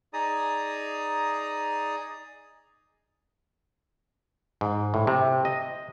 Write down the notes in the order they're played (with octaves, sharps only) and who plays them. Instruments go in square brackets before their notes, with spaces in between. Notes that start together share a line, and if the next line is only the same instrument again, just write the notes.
[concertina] D#4 G#4 D5 A#5 D#6
[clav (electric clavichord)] G#2
A2
C3
D#5